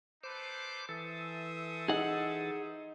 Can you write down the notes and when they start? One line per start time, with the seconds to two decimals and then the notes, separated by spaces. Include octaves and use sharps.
0.23 D#4 A4 B4 C5 D6
0.89 E3 A4 C5 E5 D#6
1.88 D#4 G#4 F#5